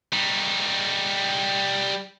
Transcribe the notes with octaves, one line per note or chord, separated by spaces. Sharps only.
G3 D#4